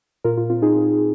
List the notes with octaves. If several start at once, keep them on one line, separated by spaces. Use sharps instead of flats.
A#2 F4 A#4
F4
C4 F4
D#4 G#4
C4